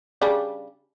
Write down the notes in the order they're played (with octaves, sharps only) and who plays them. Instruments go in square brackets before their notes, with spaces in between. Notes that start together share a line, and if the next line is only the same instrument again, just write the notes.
[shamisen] C#3 G3 D4